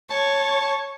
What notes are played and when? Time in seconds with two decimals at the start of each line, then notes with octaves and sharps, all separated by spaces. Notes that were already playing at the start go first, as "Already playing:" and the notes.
0.10 C#5 A5 C#6